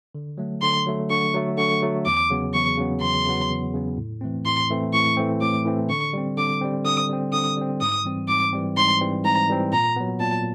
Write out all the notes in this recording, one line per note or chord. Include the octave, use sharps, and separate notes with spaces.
D3
F#3 A3
D3 C6
F#3 A3
D3 C#6
F#3 A3
D3 C#6
F#3 A3
E2 D6
C#3 F#3 B3
E2 C#6
C#3 F#3 B3
E2 C6
C#3 F#3 B3
E2
C#3 F#3 B3
A2
E3 A3 C4
A2 C6
E3 A3 C4
A2 C#6
E3 A3 C4
A2 D6
E3 A3 C4
D3 C#6
G3 C4
D3 D6
G3 C4
D3 D#6
G3 C4
D3 D#6
G3 C4
G#2 D#6
E3 G3 C4
G#2 D6
E3 G3 C4
G#2 C6
E3 G3 C4
G#2 A#5
E3 G3 C4
A#2 A#5
F#3 B3
A#2 A5